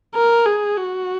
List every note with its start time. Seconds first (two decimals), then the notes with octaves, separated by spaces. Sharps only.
0.15 A#4
0.46 G#4
0.77 F#4